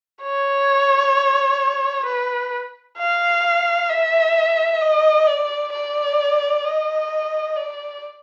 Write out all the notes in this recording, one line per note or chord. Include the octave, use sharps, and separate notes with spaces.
C#5
B4
F5
E5
D#5
D5
D5
D#5
D5